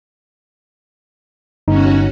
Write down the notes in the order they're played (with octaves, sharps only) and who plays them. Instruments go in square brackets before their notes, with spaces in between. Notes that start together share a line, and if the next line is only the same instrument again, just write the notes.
[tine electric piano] G1 G2 D#4 [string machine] C#4 F#4